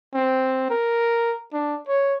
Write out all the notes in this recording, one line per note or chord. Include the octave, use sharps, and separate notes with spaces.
C4
A#4
D4
C#5